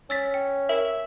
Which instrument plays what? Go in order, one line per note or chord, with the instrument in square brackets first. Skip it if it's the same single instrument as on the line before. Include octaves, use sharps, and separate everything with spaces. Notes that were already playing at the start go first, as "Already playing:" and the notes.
[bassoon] C#4 [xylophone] E6 A6 B6
[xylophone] G5
[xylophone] A#4 [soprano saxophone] E5